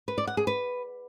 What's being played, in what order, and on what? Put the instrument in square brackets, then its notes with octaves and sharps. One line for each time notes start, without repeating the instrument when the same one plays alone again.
[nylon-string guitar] B4
D5
F#5
G#4
B4